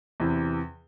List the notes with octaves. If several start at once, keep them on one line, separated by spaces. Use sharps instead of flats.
E2 C3 E3